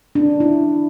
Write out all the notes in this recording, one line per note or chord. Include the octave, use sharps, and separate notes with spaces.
D4
E4